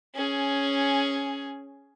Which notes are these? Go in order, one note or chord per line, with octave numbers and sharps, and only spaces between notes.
C#4 G#4